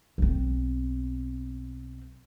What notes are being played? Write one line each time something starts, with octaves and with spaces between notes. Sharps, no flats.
B1 C4